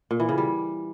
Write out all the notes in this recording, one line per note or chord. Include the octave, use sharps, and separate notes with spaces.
A#2
E3
C#3
G3